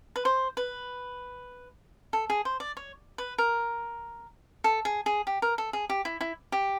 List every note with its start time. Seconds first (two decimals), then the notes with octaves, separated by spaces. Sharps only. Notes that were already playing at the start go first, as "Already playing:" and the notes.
0.16 B4
0.25 C5
0.57 B4
2.13 A4
2.30 G#4
2.45 C5
2.60 D5
2.77 C#5
3.18 B4
3.38 A#4
4.64 A4
4.85 G#4
5.06 G#4
5.27 G4
5.42 A#4
5.58 A4
5.73 G#4
5.90 G4
6.05 E4
6.21 E4
6.52 G4